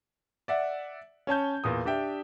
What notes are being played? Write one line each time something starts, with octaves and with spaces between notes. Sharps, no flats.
D5 E5 F#5
C#4 C#5 A5 G6
E2 A#2 D#6
D4 G4 E5 G5